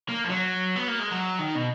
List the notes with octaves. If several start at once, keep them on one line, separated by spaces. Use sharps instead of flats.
A#3
F3
F#3
B3
A#3
G#3
F#3
D#3
B2